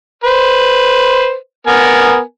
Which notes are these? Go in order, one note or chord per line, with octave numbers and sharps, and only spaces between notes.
B4 C5
B3 A#4 G#5